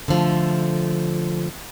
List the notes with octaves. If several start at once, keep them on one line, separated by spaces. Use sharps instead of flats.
D3 F3 A3